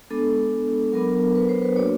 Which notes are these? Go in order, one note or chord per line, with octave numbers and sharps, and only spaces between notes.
G#3 B3 D4 A4
F#3 B3 D4 A#4
B4
C5
B4
A#3 D4 F#4 C#5